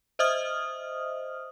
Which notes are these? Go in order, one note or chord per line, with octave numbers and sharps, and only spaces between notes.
C5 D#5 E5 D#6 F6